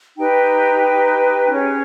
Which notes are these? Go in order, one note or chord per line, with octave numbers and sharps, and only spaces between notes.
D#4 G4 B4 G5
C#4 G#4 C#5